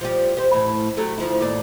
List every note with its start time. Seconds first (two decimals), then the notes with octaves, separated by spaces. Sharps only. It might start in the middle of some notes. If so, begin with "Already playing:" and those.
0.01 F3 G3 G4
0.37 G4 C5
0.53 A2 E3
0.97 F#3 G3 A3
1.18 D2 F3 E4
1.41 D#2 A2 D5